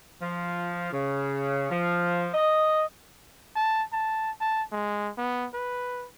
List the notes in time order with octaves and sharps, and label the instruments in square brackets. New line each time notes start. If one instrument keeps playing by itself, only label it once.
[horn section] F3
C#3
F3
D#5
[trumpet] A5
A5
A5
G#3
B3
B4